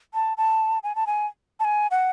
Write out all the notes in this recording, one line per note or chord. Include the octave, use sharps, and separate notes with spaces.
A5
A5
G#5
A5
G#5
A5
G#5
F#5